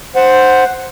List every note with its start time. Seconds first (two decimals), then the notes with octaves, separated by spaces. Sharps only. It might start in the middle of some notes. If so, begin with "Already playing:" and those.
0.16 C5 F#5